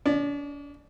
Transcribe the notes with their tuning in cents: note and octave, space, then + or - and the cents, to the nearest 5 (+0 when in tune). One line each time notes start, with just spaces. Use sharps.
D4 -45 D5 +35